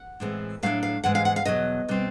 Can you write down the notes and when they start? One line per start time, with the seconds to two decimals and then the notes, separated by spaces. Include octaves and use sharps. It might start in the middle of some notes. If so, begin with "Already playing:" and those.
Already playing: F#5
0.20 A2 E3 G#3 C4
0.63 A2 F#3 A3 D4 F5
0.83 F5
1.04 G#2 E3 G#3 F#5
1.15 F5
1.25 F#5
1.36 F5
1.45 E2 B2 F#3 D#5
1.89 B2 G3 C4